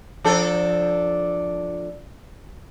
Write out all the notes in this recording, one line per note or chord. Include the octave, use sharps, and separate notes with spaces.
F3 D4 A4